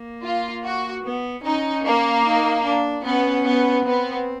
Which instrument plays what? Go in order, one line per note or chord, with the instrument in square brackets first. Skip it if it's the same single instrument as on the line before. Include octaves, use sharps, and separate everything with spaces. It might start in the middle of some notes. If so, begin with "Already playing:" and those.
Already playing: [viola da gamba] A#3
[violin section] F4
F#4
[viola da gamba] B3
[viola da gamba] C#4 [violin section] D#4
[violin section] A#3
[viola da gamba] D#4
D4
[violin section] B3 [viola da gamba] C#4
[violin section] B3
[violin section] B3 [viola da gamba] C4